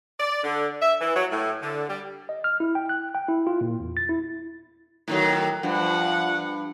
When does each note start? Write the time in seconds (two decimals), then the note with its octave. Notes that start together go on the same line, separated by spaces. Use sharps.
0.19 D5
0.43 D3
0.82 E5
1.01 E3
1.15 F#3
1.31 A2
1.61 D3
1.88 G3
2.29 D#5
2.44 F6
2.60 E4
2.75 G5
2.89 F#6
3.15 G5
3.29 E4
3.47 F4
3.61 A#2
3.80 E2
3.97 A6
4.09 E4
5.08 A2 D#3 F#3
5.63 G2 F3 F#5